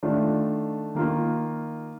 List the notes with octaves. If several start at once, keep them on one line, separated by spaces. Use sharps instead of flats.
D#3 A3 D4 F4
D#3 A#3 F4